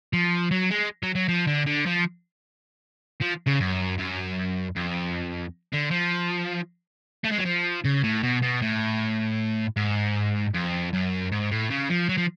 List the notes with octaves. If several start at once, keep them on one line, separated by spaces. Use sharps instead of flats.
F3
F#3
G#3
F#3
F#3
F3
D3
D3
F3
F3
C#3
F#2
F#2
F2
D3
F3
A3
G#3
F#3
F3
C#3
A2
B2
B2
A2
G#2
F2
F#2
G#2
A2
C#3
F3
F#3
F3